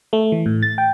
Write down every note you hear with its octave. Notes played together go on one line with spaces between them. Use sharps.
A3
E3
A2
A6
G5